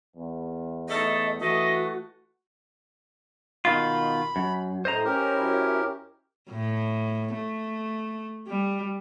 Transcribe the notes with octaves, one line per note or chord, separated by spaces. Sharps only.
E2
A3 D#4 A4 D#5
E3 A3 F#4 D#5
B2 D#3 F4 B5
F#2
A2 C5 D#5 A#5
C#4 G4 A#4
F#2 C#4 E4
A2
A3
G3